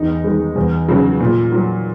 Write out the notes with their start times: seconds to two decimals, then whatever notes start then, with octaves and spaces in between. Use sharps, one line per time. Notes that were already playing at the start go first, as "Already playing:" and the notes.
Already playing: E2 D#4
0.24 D#3 G#3
0.56 E2
0.88 C#3 F#3
1.20 A#2
1.52 F#3